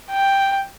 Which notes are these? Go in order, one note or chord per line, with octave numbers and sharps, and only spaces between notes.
G5